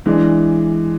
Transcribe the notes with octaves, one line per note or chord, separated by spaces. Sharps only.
E3 G#3 D4